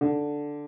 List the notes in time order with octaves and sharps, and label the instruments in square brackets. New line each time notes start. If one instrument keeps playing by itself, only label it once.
[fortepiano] D3